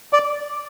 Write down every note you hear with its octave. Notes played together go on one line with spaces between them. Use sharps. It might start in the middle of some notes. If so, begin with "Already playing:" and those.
D5